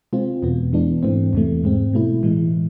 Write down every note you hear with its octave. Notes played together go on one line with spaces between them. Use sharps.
C3 G#3 C4 F4
E2 B2 B3
E3 G#3 B3 D4
G#2 E3 A3 C4
E2 C3 E3 A3
G#2 G#3 C4
B2 A3 E4
A2 E3 G#3